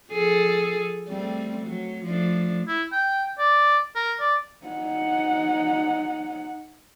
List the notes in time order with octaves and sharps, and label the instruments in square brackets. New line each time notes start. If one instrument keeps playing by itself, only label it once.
[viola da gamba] F3 G#4 A4
G3 A3 C4
F#3
F3 A3 D4
[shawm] E4
G5
D5
A#4
D5
[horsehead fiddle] D#4 F#5